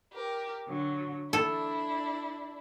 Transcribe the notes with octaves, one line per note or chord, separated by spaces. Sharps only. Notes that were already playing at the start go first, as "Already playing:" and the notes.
G4 A#4
D3 F#3
D4 E4 A4